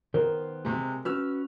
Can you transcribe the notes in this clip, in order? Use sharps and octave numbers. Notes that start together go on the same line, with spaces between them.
D#3 B3 A#4 C5
C3 G#3
C#4 F#4 B4 E6 F6